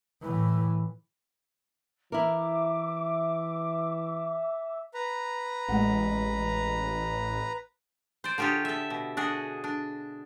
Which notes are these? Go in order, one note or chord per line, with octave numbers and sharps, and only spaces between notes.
A2 E3
E3 E4 A#4 E5 D6
B4 A#5
A1 G#3 F#5
C5 D5
D3 F4 G4 G#4 C#5
A4 E5
B2
D4 F#4 G#4
D4